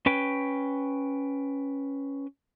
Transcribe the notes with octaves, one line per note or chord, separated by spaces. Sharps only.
C#4 B4 G5